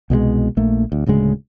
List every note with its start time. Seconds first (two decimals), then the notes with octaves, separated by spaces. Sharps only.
0.10 C2 B2 F#3 G#3
0.57 A#1 A3 A#3
0.92 D2
1.06 D1 D2 C#3 G#3